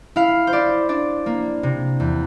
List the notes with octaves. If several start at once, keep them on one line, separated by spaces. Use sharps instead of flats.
E4 F5
C5
E4 D5
D4 D5
A#3
C3
E2